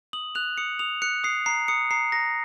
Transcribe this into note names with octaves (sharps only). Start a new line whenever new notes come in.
D#6 F#7
F#6 F7
D#6 C#7
D#6 F7
F#6 C#7
D#6 C7
A#5 C7
D#6 C#7
A#5 C7
A#5 A#6